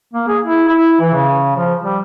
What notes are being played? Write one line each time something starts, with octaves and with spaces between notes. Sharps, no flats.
A#3
G#4
E4
E4
E3
C#3
F3
G3